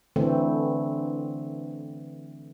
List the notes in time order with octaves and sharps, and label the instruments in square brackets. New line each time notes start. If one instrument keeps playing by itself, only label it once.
[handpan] D3 E3 A3 C4